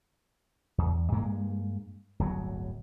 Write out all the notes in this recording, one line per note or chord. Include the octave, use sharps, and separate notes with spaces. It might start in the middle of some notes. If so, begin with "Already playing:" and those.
E2
G2 G#3 A#3
D1 G1 F#3